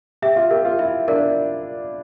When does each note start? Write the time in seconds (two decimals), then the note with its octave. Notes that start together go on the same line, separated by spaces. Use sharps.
0.22 G4 E5
0.36 F4
0.51 G4 A#4
0.65 F4
0.79 E4 E5
1.08 D4 A#4